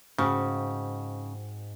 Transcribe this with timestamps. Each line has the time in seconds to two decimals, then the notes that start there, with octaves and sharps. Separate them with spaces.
0.19 G#2 C#3 C4 F#4